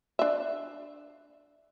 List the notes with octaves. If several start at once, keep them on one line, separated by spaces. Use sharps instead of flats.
D4 E5